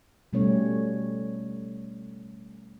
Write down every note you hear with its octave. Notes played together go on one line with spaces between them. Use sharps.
B2 G3 A3 C#4 C#5